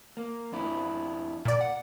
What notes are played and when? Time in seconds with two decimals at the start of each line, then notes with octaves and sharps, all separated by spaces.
0.17 A#3
0.52 F2 D4 E4
1.45 A#2 D5
1.61 F#5